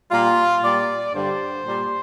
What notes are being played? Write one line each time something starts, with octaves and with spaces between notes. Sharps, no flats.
A#2 G3 F4
A#2 G3 D5
G2 D3 G3 C5
A#2 G3